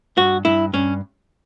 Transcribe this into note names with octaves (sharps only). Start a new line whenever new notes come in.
G2 F#4
G2 E4
G2 C#4